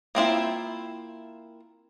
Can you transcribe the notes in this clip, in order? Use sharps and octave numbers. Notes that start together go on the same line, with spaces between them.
A#3 C4 E4 F4